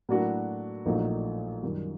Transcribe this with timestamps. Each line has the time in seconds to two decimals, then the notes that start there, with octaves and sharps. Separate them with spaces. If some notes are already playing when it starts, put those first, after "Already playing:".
0.09 A2 F#3 A#3 D4 F#4
0.86 A#1 A#2 F#3 A3 D#4
1.63 F#2 D#3 G3